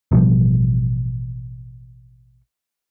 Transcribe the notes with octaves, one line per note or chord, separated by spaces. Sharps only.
A1 B2 F3 G3